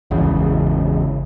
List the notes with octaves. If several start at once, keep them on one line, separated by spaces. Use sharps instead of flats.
G#1 E2 C#3